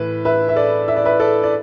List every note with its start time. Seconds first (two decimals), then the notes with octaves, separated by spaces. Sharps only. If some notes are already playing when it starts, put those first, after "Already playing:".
Already playing: A2 E3 B4
0.25 B4 E5
0.48 E5
0.56 A4 D5
0.88 E5
0.96 D5
1.05 B4 E5
1.20 A4 D5
1.43 D5